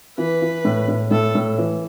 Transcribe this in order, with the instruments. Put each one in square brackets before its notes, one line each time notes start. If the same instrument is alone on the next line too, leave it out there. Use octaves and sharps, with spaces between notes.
[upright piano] E3 [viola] B4
[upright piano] E3
A2
A2
[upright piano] A2 [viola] A4
[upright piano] A2
E3